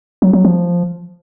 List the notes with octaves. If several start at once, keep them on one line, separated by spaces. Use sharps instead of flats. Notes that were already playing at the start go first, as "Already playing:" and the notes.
F#3
F#3
F3